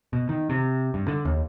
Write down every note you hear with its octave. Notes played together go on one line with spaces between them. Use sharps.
B2
D#3
C3
G2
D3
D#2